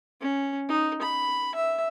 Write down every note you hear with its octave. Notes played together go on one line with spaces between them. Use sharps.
C#4
D#4
B5
E5